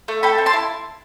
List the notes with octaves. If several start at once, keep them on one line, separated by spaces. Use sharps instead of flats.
A3
A4 G5 B5
C4
A5 C6
E4